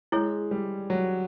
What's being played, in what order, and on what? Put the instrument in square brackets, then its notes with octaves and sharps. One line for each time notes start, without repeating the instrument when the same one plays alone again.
[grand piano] G#3 [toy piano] E4 G#4 C#5
[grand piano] G3
F#3